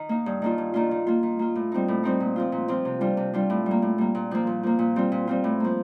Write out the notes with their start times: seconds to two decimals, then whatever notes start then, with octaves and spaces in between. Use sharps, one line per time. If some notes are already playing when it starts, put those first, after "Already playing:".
Already playing: D#3
0.09 A#3 D#4
0.26 G2
0.42 D#3 A#3 D4 F4
0.58 G2
0.74 D#3 A#3 D4 F4
0.91 D#3
1.07 A#3 F4
1.23 D#3
1.39 A#3 F4
1.55 A2
1.72 G3 C4 D#4
1.88 A2
2.03 G3 C4 D#4
2.20 A#2
2.36 F3 C4 F4
2.52 A#2
2.68 F3 C4 F4
2.85 C3
3.01 G3 D4 F4
3.17 C3
3.34 G3 D4 F4
3.50 A2
3.66 G3
3.71 A#3
3.82 A2
3.98 G3 A#3
4.15 A#2
4.31 F3 A#3
4.47 A#2
4.63 F3 A#3
4.79 A#2
4.96 G3 C4 F4
5.12 A#2
5.27 G3 C4 F4
5.44 A2
5.60 F3 A#3